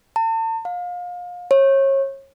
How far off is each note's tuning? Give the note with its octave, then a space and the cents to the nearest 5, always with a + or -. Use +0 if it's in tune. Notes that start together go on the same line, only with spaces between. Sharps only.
A5 +40
F5 +30
C#5 -30